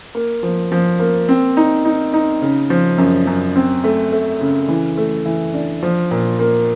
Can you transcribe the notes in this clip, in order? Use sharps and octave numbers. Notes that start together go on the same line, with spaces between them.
A#3
F3
F3
A#3
C4
D#4
D#4
D#4
C#3
F3
F#2
F#2
C4
A3
A3
C#3
E3
A3
E3
D4
F3
A#2
A#3